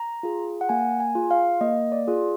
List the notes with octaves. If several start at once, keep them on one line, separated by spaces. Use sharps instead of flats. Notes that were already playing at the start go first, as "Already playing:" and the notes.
Already playing: A#5
F4 G#4
F#5
A#3 G#5
G#5
F4 G#4
F5
A#3 D#5
D5
F4 G#4